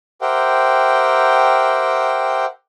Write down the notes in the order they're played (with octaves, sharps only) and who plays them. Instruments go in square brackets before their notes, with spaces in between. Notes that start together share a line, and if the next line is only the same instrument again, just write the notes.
[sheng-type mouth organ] G4 A#4 C5 E5 F#5 G5